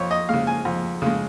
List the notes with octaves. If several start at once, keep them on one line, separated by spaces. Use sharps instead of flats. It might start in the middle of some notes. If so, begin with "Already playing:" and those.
Already playing: F2 C#5
D#5
C#3 G#3 F5
G#5
F2
C#3 G#3